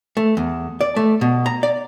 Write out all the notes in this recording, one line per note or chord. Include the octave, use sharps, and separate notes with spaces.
A3
E2
D5
A3
B2
A#5
D5